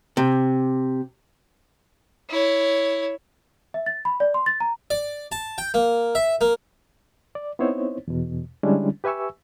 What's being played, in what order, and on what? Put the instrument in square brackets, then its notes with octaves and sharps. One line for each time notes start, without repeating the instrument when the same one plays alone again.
[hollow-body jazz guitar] C3
[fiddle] E4 C#5
[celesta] E5
A6
B5
D5
C6
A6
A#5
[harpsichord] D5
A5
G5
A#3
E5
A#3
[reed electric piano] D5
B3 C4 D#4 E4 C5 C#5
E2 B2
D3 G3 G#3 C#4 D4 E4
G4 B4 E5 G#5 C#6 E6